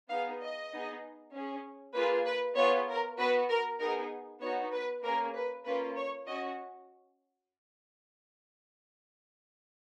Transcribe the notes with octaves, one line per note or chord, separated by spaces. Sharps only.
B3 D#4 G#4 F5
D#5
B3 D#4 G#4
C#4 G#4
A#3 F4 G#4 B4
B4
B3 F4 G#4 C#5
A#4
B3 F#4 B4
A#4
B3 D#4 G#4 A#4
B3 D#4 F#4 C#5
B4
A#3 C#4 G#4 A#4
B4
A#3 C#4 F4 B4
C#5
C#4 F#4 D#5